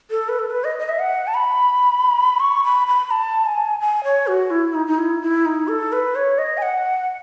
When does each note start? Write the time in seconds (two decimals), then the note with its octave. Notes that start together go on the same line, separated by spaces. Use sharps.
0.11 A4
0.29 B4
0.39 A4
0.51 B4
0.64 D#5
0.79 D#5
0.89 E5
0.99 F#5
1.27 A5
1.34 B5
2.40 C#6
2.64 B5
2.87 B5
3.11 A5
3.46 G#5
3.80 G#5
4.04 C#5
4.27 F#4
4.51 E4
4.74 D#4
4.87 D#4
4.99 E4
5.22 E4
5.46 D#4
5.68 A4
5.93 B4
6.15 C#5
6.38 D#5
6.58 G#5
6.62 F#5